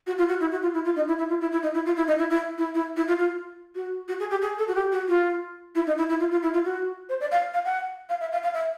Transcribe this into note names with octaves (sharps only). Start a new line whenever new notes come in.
F#4
F4
F#4
E4
F#4
F4
E4
F4
D#4
E4
E4
F4
E4
E4
D#4
E4
F4
E4
D#4
E4
E4
E4
E4
E4
F4
F4
F#4
F#4
G#4
G4
G#4
A4
F#4
G4
F#4
F4
E4
D#4
E4
E4
F4
F4
E4
F4
F#4
C5
D5
F5
F5
F#5
F5
E5
F5
F5
E5